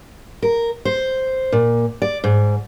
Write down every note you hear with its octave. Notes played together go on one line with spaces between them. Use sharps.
A#4
C5
A#2
D5
G#2